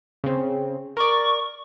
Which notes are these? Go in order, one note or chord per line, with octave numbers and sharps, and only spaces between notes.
C#3 C4
A#4 D5 C#6